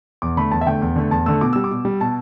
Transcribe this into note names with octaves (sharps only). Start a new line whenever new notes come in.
E2 D6
D3 A3 B5
E2 A5
E5
D3 A3 G5
E2
D3 A3
E2 A5
D3 A3 E6
B2 D6
G3 E6
D6
B2
G3
B2 A5